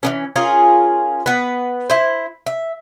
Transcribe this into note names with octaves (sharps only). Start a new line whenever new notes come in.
E3 B3 C#4
C#4 F4 G#4 A#4
B3 B4
E4 C5
E5